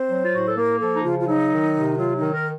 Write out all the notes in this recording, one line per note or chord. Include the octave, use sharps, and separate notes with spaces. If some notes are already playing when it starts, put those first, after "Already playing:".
Already playing: C4 C5
F#3
F4
A2 F#4
A4
A#3 A#4
F3 A4
D#4
C#3 F4
F4
F#3 D#4
D#3
C3
F#3 F4
D#4
D#3
A#4